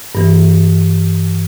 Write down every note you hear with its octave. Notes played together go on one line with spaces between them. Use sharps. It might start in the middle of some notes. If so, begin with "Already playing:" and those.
G2 E3